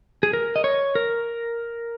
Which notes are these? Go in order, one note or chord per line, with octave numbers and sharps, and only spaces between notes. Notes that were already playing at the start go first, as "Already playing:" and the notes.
G#4
A#4
D#5
C#5
A#4